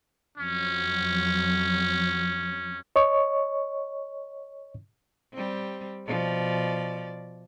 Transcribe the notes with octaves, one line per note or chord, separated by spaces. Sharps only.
F2 F#3 C#4
C#5 D#5 C#6
G3 C4
B2 F3 D5